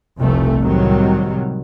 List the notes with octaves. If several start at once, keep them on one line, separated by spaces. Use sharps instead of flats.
F1 C2 F2 C3 A3
C2 A2 C3 D#3 F#3 G3